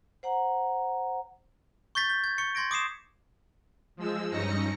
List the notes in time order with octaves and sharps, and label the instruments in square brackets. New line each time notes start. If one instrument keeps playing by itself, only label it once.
[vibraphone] C5 F#5 A#5
[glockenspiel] C#6 G6 A6 B6
G6
G#6
C#6 C#7
C6 G#6 A#6 D7
D6 D#6 C7 E7
[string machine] F3 G#3 E6
G2 C#4 D#4 A#6 C#7